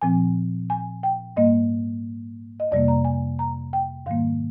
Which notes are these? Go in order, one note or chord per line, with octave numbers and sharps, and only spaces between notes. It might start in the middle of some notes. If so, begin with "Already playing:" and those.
A#2 F3 C4 G#5
G#5
G5
G#2 G3 A#3 D#5
D#5
F2 C3 G3 A#3 D5
A#5
G#5
A#5
G5
G#2 D#3 G3 A#3 F5